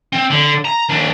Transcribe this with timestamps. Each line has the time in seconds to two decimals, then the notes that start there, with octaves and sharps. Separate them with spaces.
0.13 C4
0.30 D3
0.65 A#5
0.89 D#2 D4